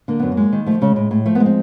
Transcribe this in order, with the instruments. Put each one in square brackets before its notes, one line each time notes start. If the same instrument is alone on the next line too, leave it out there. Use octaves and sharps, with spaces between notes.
[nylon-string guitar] D3 A#3
F#2 B3
A#3
G#3
D#3
F3 A3
C#3 G#3
A2
A2
F3 A3
G#3 B3
C4